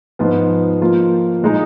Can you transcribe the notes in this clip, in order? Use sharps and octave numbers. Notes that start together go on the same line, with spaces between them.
G#2 F3 B3 F4
F3 A#3 F4
A#2 G#3 D#4